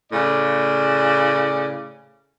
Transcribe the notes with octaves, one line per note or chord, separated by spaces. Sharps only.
A2 C#3 D5